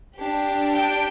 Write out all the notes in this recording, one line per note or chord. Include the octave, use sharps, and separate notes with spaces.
D4 G4
G5